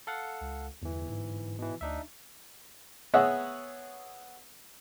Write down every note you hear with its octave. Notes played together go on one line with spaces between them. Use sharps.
A4 F5 F#5
C#2
G1 E2 E3
G#2
B2 E3
D2 D4 D#4 E5
B3 G#4 C#5 D#5 E5 F#5